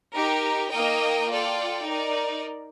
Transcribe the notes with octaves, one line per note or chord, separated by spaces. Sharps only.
D#4 G4 A#4
A#3 D#4 A#4 D#5 G5
F4 A4 D5 G5
D#4 A#4 D5